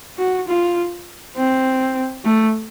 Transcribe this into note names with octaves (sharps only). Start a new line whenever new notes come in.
F#4
F4
C4
A3